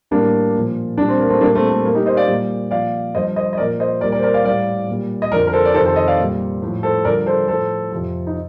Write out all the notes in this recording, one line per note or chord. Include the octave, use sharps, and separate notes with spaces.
A2 G3 A#3 D4
A#2 F3
A#2 G3 D4
C4
A#3
A3 C4
A#2 G3 A#3 D4
A3 C4
A3
A#2 G3 A#3
D#4 G4
C5 D#5
D5 F5
A#2 G3
A#2 F3 D5 F5
G2 F3 C5 D#5
C5 D#5
D#5
A#2 F3 A#4 D5
C5 D#5
A#2 G3 A#4 D5
A#4 D5
C5
A#4 D5
D5 F5
A2 G3 D5 F5
A#2 G3
D#5
F2 D3 F3 A#4 D5
A#4
A4 C5
D5
F2 C3 D#3 A4 C5
A4 C5
C5 D#5
D5 F5
A#2 G3
A2 F3
A4 C5
G2 D3 F3 A#4 D5
A4 C5
A2 F3 A4 C5
F2 C3 F3
D#4